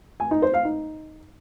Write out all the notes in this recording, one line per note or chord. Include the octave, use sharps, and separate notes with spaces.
G#5
D#4
C5
F5
D#4